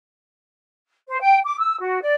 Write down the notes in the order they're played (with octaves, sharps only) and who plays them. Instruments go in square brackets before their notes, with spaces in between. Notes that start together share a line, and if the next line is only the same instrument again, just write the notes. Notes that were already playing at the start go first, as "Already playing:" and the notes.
[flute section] C5
G5
D6
E6
F#4
D5